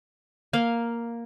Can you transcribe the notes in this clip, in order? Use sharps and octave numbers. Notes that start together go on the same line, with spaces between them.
A#3 F5